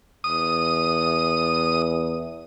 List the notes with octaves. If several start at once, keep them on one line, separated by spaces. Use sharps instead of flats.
E2 D#6